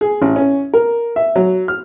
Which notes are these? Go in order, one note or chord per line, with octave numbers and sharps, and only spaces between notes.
G#4
A1
C#4
A#4
E5
F#3
F6